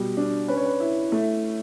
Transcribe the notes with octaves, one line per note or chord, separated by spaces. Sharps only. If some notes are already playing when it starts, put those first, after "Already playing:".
Already playing: B2 G3
D4
C#4 B4
C#5
B4
E4
A3